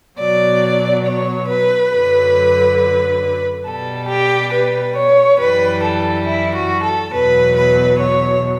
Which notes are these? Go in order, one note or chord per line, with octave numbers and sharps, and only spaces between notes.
B2 F#3 D5
C#5
B4
F#2 D3 F#3
B2 G3 A4
G4
B4
C#5
F#2 E3 G3 B4
A4
E4
F#4
A4
E2 B2 F#3 B4
B4
C#5